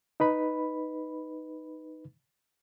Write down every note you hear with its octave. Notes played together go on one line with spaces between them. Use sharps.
D#4 B4 B5